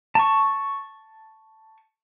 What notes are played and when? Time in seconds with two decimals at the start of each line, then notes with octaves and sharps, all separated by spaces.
0.15 A5 C#6